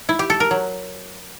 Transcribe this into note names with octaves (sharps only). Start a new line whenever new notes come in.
E4
G4
A4
A#4
F#3